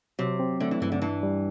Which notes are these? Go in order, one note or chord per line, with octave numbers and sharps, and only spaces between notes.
C3 F#3
C4
D3 A3
E3
G2 E3
D3
E3 D4
G3